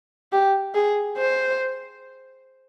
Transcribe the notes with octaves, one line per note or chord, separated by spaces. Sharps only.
G4
G#4
C5